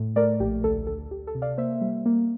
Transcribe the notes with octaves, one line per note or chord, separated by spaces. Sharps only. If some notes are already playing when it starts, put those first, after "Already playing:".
Already playing: A2
A3 A#4 D5
A#1 G4
D2 A4
D2 A4
D2 G4
A4
C3
D5 F5
A#3 C5 E5
G3
A#3